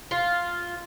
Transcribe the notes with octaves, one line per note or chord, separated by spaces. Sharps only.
F4